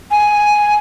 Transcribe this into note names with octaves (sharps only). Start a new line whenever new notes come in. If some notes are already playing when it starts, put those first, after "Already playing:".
G#5